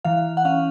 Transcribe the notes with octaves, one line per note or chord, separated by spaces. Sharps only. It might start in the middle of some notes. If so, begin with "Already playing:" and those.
E3 F5
F#5
C#4 F5